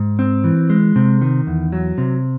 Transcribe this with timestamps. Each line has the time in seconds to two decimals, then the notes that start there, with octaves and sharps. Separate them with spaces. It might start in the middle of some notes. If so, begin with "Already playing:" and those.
Already playing: G#2
0.19 C4
0.44 E3
0.70 G#3
0.96 C3
1.21 D#3
1.47 E2
1.72 F#3
1.98 C3